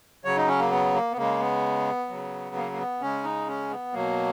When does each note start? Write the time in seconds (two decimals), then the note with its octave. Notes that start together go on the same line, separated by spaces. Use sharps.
0.24 C#3 F#3 C#5
0.37 D#4
0.48 C#4
0.59 A#3
0.71 B3
0.94 A#3
1.12 B3
1.17 C#3 G#3 A#3
1.40 B3
2.09 C#3 F#3
2.55 A#3
2.72 A#3
2.78 B3
3.01 C#3 G#3 C#4
3.24 D#4
3.48 C#4
3.70 B3
3.93 B2 F#3 A#3